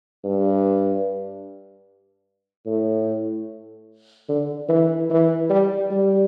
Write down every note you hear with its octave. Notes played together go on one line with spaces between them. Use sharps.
G2
A2
D3
E3
E3
G3
G3